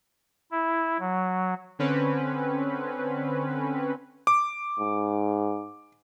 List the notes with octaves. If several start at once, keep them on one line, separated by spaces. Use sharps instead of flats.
E4
F#3
D3 C4 C#4 B4
D6
G#2